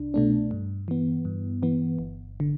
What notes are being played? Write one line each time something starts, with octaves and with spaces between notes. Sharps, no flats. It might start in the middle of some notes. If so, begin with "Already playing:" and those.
Already playing: C2 D4
B2 A3 D4
G2
E3 B3
G2
E3 B3
G1
D3